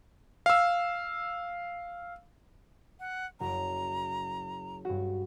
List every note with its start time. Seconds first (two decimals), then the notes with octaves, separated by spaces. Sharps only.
0.46 F5 E6
3.00 F#5
3.40 F#1 F#4 A#5
4.85 G2 F#4